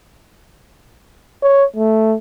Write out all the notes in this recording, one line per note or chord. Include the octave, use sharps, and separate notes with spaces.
C#5
A3